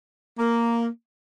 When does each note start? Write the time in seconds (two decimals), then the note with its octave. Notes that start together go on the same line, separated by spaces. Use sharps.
0.39 A#3